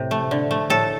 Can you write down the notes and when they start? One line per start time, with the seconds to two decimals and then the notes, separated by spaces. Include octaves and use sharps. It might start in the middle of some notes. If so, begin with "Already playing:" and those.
Already playing: A2 C3
0.11 A3
0.31 D3
0.51 A3
0.70 A2 A4